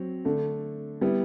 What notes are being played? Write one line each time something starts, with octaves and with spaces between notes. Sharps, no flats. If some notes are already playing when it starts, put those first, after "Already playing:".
Already playing: F#3 C4
D3 A3 D4
G3 B3 E4